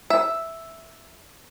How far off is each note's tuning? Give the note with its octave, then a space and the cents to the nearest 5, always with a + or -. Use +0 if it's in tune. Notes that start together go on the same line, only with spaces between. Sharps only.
E5 +0